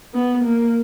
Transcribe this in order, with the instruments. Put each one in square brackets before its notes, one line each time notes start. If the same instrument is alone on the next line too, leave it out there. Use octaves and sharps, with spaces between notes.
[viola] B3
A#3